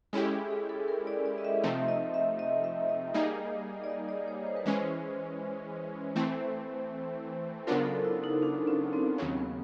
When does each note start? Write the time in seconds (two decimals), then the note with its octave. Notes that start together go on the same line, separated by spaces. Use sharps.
0.13 G#3 C#4 E4 G4 A4
0.32 G#4
0.51 G#4
0.69 A4
0.88 A#4
1.07 D5
1.26 D5
1.38 D#5
1.45 E5
1.64 C3 F3 A3 C4 D#4 E5
1.88 D#5
2.14 E5
2.39 D#5
2.64 E5
2.89 D#5
3.14 G3 A#3 D#4 G#4
3.84 D5
3.90 D#5
4.09 D5
4.28 C#5
4.47 C5
4.57 B4
4.66 E3 G#3 C#4 C5
6.16 E3 A3 C4 C5
7.67 C#3 F#3 B3 D4 F4 A#4
7.86 A4
8.05 E4
8.24 D#4
8.43 D4
8.67 C#4
8.93 C4
9.18 D#2 C#3 F#3 C4
9.37 B3